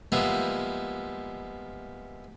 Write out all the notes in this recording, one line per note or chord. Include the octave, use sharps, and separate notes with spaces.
F3 G3 G#3 A#3 B3 E4